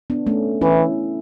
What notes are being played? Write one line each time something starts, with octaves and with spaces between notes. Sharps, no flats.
B3 D4
A3 C#4
E3 C#4 E4